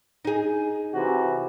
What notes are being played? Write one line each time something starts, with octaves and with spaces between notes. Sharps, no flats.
D#4 G#4
C3 E3 F#4